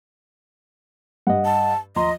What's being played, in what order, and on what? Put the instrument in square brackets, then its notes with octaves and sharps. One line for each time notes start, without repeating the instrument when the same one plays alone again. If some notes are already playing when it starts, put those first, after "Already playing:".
[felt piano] G2 [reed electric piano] D#5 F#5
[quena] A5
[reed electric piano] D#2 A#5 C6 [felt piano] F3 [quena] D#5